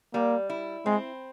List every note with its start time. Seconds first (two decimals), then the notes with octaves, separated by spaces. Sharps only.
0.14 G3 A#3
0.49 E4
0.86 G#3 C4